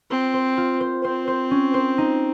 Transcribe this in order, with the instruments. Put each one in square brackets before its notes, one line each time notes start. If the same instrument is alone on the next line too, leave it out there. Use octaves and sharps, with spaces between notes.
[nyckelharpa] C4 [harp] F4
[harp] C5
F4
C5
[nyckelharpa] C4 [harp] C5
[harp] C5
C#4
C5
D#4